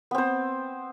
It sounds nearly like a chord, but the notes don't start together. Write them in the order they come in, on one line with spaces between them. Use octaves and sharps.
B3 C4 C5